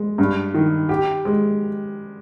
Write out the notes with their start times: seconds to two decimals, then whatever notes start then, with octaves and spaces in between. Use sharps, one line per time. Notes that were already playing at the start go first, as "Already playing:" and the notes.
Already playing: G#3
0.18 G2
0.54 D#3
0.89 G4
1.25 G#3